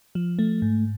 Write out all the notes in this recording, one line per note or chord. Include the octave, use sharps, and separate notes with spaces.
F3
A3
G#2